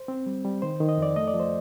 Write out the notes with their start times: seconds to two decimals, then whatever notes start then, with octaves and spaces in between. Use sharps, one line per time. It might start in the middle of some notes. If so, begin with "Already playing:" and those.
Already playing: C5
0.08 C4
0.26 G3
0.44 G3
0.62 D#3 C5
0.80 D#3
0.89 D#5
0.97 F2 D5
1.16 A3 D#5
1.28 D5
1.34 F3
1.40 C5